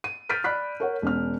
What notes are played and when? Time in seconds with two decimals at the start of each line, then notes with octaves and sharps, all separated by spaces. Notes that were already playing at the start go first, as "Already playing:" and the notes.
0.04 D#7
0.29 F6 G6 A6 B6 D7 D#7
0.44 D5 B5 F#6 B6
0.80 A#4 C#5 F#5
1.02 E1 C#4 F6